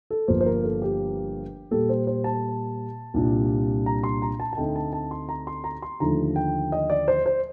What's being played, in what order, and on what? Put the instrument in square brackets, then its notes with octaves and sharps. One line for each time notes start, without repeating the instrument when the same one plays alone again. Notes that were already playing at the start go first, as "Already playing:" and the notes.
[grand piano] A4
G1 G2 F3 A#3 C5
C5
A#4
A4
G4
A#2 G3 A#3 A4
C5
C5
A5
C2 A#2 G3 D4 F4
A#5
C6
A#5
A5
A5
D2 D3 A3 C4 D#4 G5
A5
A5
C6
A#5
C6
A#5
C6
D#2 D3 F3 A3 A#5
G5
D#5
D5
C5
C5